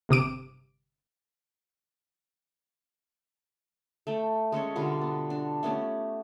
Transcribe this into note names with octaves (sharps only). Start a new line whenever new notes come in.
G1 C3 D6 D7
A3 A4 G5
G#3 C#4 A4 C#5
B2 D3 G3 F4
B3
D4
A3 B3 C#4 G4